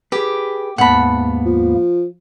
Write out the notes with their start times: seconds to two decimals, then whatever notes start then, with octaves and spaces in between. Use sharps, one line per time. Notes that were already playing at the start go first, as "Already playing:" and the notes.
0.12 G4 G#4 B4
0.78 D#2 G#2 A#3 B3 F#5 A5 B5
1.45 F3